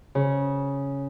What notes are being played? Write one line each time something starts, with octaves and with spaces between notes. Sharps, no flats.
C#3